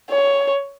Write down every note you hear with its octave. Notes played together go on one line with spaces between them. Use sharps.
C#5